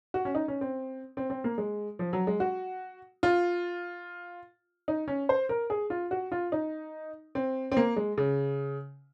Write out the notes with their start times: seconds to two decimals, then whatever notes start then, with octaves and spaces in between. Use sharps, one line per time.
0.14 F#4
0.25 C#4
0.35 D#4
0.48 C#4
0.61 C4
1.17 C4
1.30 C4
1.44 A#3
1.58 G#3
1.99 F3
2.13 F#3
2.27 G#3
2.40 F#4
3.23 F4
4.88 D#4
5.08 C#4
5.29 C5
5.49 A#4
5.70 G#4
5.90 F4
6.11 F#4
6.32 F4
6.52 D#4
7.35 C4
7.72 C4
7.77 A#3
7.96 G#3
8.18 C#3